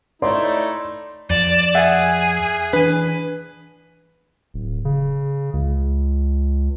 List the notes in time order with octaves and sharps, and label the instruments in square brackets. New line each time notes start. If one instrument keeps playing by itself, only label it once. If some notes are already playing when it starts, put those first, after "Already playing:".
[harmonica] A3 D#4 E4 [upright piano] C#5 D5 C6
[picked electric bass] F2 [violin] D5 E7
[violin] G#4 [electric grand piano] E5 F#5
[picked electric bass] E3 D4 [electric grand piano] B4
[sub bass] D1
C#3
C#2